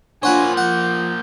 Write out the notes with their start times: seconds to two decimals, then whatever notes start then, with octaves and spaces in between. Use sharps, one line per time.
0.23 A#3 D4 F4 C5 C#5 F#5 G#5 B5
0.57 F3 F#5 G6